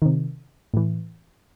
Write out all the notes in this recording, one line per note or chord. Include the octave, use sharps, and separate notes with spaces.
C3 D#3
A2 E3